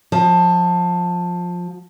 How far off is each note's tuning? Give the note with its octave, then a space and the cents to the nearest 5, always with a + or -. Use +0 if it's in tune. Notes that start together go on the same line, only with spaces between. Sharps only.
F3 +20